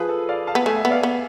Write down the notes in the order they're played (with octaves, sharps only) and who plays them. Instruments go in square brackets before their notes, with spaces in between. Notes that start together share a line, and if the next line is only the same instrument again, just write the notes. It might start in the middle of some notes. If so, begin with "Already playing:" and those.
Already playing: [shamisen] F3 [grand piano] G#4 B4
[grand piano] A4
D5 F5
F5 A5
[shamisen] B3
[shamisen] A3 [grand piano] E5 G#5
[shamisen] B3 [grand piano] E5
[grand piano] D5 F5
[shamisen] B3